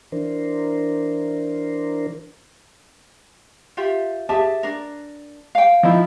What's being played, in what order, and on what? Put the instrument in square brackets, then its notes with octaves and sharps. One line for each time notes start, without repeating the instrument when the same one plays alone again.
[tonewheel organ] E3 D4 A#4 C5
[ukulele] F4 G4 E5
[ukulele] G4 G#4 E5 [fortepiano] A5
[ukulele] D4 A#4
F5 G5
[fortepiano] F3 D#4 E4